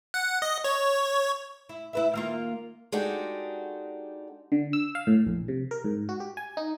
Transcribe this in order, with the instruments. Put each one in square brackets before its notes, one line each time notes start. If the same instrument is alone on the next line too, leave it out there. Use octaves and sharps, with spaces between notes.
[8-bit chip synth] F#5
D#5
C#5
[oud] E4
E4 B4 E5
D#3 A#3 F4
[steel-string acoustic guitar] G#3 D4 D#4 F#4 G4 A4
[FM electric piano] D3
E6
F5
A2
A#1
C3
A#4
G#2
F#4
G4
G#5
D#4